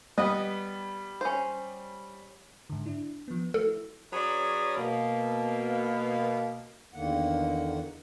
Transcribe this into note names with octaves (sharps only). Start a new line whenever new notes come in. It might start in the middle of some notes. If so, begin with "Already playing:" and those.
G3 B3 D#5
C#4 C5
G#2 D3
D4 E4
F3 B3
A3 F#4 A4
E4
F#3 C#4 G#4 B4 C#5 D5
B2 A#3
E2 D3 D#3 A#3 F#5